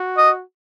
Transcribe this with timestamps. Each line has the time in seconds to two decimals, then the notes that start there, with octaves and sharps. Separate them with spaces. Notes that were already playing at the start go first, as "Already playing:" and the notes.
Already playing: F#4
0.18 D#5